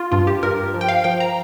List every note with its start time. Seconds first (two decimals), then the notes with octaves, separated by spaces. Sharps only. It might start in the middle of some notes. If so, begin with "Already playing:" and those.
Already playing: F4
0.12 G2 F4
0.27 G4
0.43 G2 A#4
0.74 F3
0.81 G5
0.89 F5
1.04 F3 G5
1.20 A#5